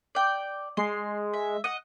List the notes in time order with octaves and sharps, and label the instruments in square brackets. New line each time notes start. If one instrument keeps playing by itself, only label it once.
[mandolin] D5 G5
[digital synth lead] G#3 [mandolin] C6
[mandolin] E5
D#5 F#5